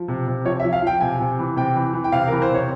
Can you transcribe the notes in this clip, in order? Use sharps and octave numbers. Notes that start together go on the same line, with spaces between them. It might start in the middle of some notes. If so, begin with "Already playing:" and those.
Already playing: F3
C3
C3
F3 C#5
E5
F3
F5
F3 G5
C3 G#5
C3
E3
C3 G5
E3
E3
G5
C3 F5
E3 A#4
C5
C3
C#5